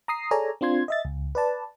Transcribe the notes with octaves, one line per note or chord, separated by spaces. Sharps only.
A#5 D#6 C7
G#4 A4 C#5 D5 G#5 A#5
C4 D4 F4 C6 G#6
D#5 E5 A6
C#2
B4 D5 A5